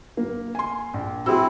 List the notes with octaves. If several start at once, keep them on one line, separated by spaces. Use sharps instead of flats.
A#3
G#5 C6
A#1
C4 E4 F#4 G#4 E6